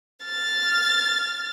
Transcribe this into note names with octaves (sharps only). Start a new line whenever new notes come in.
F6 A6